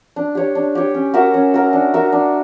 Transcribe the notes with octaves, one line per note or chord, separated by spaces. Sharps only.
D4
G4 C#5
D4
G4 C#5
C#4
F#4 A#4 E5
C#4
F#4 A#4 E5
D4
F#4 A#4 E5
D4